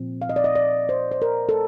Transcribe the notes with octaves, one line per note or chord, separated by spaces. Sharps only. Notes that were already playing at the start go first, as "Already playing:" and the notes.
Already playing: A#2 F3 C4
F5
D#5
D5
D#5
D5
C5
C5
A#4
A4